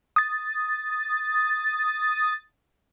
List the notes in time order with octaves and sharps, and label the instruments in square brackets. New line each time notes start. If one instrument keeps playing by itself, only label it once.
[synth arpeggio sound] D#6 A6